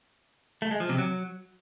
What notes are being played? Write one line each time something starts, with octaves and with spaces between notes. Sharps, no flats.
A3
G#3
F3
C3
F#3